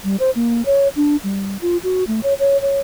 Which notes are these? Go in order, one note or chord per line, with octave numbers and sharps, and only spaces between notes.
G3
C5
A#3
C#5
D4
G3
F4
F#4
A3
C#5
C#5
C#5